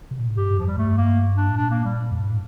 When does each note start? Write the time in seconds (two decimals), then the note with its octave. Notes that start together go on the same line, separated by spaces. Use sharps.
0.11 C3
0.19 A#2
0.28 A2
0.37 G2 G4
0.57 F2 F3
0.67 G3
0.77 G2 A3
0.97 A#3
1.37 D4
1.50 A2
1.57 A#2 D4
1.71 A#3
1.84 G3
2.11 F2
2.20 G2
2.28 A2